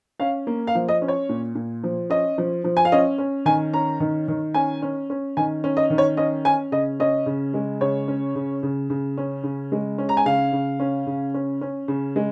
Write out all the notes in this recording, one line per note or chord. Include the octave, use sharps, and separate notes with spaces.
C#4 F5
A#3
F5
F3
D#5
C#4
C#5
A#2
A#2
F3
C#4 D#5
F3
F3
G#5
F5
C#4 D#5
C#4
D#3 G#5
C#4 A#5
D#3
D#3
C#4 G#5
C#4
C#4
D#3 G#5
C#4
D#5
D#3
C#5
C#4 D#5
C#4 G#5
C#3 D#5
C#4 D#5
C#3
G#3
C#3 C#5
C#4
C#3
C#3
C#3
C#4
C#3
G#3
C#4
A#5
G#5
C#3 F5
C#3
C#4
C#3
C#4
C#4
C#3
G#3